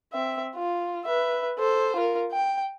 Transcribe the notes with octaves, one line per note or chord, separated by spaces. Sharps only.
C4 E5
F4
B4 E5
A4 C5
F4 A#4
G5